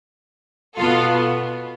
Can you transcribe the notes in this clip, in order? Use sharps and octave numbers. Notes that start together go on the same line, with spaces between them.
B2 B3 F4 A4